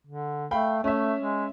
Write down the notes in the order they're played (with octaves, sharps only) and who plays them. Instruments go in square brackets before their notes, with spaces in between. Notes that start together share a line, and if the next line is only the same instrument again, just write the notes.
[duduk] D3
[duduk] A3 [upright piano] F5 G5 B5
[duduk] A3 [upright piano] C#4 E5
[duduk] G#3